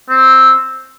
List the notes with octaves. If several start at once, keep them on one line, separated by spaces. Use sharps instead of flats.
C4